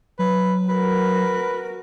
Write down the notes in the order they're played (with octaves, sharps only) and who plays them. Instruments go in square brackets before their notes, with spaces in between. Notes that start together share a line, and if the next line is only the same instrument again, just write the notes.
[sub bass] F#3 [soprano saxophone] B4
[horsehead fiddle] F#4 A#4 [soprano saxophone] B4